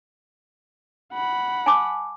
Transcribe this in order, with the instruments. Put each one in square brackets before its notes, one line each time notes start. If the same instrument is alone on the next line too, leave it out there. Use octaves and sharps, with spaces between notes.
[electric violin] F#5 B5
[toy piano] G#5 A5 D6